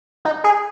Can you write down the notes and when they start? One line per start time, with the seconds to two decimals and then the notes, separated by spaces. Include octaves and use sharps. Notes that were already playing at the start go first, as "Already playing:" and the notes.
0.25 D#4
0.44 G#4